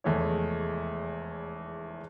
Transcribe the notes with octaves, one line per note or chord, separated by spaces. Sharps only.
F1 E2 G#3 A3 E4 C#5